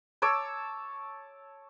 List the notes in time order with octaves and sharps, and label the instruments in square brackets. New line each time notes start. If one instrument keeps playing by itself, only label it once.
[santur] C#5 A5 D6 E6